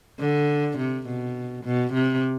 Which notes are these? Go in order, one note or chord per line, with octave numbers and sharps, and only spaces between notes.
D3
C3
B2
B2
C3